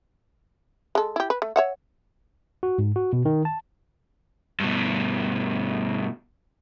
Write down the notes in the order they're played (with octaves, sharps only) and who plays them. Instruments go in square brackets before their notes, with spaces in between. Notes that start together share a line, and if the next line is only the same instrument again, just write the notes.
[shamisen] G#3 A4
E4 G4
B4
A3
C#5 E5 F#5
[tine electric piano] F#4
G#2
F#4
B2
D#3
A5
[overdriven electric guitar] G2 B2